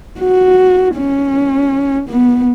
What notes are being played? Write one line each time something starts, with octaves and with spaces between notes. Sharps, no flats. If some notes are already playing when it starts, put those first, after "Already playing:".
F#4
C#4
B3